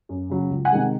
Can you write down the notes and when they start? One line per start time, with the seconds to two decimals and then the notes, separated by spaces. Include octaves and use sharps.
0.09 F#2
0.30 C#3 F#3
0.50 C#2
0.65 F#5 G#5
0.72 C3 D#3 G#3